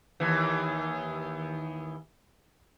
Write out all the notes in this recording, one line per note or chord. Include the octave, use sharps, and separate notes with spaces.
D#2 E3